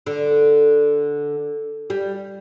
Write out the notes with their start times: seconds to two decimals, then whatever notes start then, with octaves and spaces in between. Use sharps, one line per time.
0.06 D3
1.90 G3